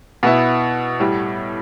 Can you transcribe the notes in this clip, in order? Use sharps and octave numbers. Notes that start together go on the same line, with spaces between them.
B2 B3 E4
A2 G3